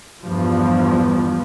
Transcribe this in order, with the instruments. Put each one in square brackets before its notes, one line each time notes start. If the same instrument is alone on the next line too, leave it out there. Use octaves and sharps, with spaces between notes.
[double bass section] E2 G2 F3